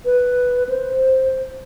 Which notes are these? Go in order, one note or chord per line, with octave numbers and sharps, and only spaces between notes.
B4
C5